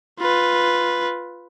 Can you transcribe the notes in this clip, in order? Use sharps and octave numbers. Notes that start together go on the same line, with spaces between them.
F4 B4